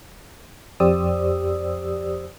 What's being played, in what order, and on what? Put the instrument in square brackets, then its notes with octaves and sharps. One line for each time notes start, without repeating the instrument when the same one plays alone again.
[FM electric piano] F2 G4 C5 D5 D#6 E6